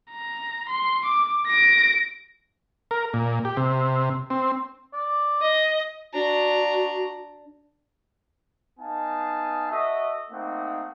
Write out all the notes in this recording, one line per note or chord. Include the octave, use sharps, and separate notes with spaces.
A#5
C6
D6
A#6 D7
A#4
A#2
G4
C3
C4
D5
D#5
D4 F#4 A#5
B3 D#4 F5 G#5 A5
F#4 A4 D#5 E5
A3 A#3 C4 D#4 F#5